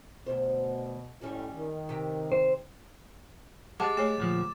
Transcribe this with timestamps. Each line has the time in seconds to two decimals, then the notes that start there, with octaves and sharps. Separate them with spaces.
0.26 D2 B2 C5
1.21 A2 G3 C#4 F#4
1.54 D#3
1.89 C3 G4
2.32 C5
3.80 G#3 G4 F#5 A5 D6 A6
3.97 A3 G#4 C#5 E7
4.18 D2 A#2 F3